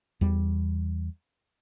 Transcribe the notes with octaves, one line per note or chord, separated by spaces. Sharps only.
E2 G3